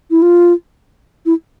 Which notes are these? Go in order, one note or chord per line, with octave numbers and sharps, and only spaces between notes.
E4
F4
E4